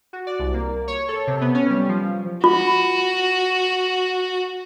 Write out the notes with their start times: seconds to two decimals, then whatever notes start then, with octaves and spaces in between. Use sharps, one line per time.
0.13 F#4
0.27 D5
0.39 C2
0.54 A#3
0.87 C#5
1.08 A4
1.27 C3
1.41 B3
1.54 C#4
1.70 G3
1.89 F3
2.44 F4 F#4